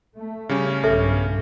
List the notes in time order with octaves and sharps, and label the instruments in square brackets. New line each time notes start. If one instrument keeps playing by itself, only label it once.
[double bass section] A3
[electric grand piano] C#3 G3 C#4
[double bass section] B1 G2 [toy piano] A4 C5 E5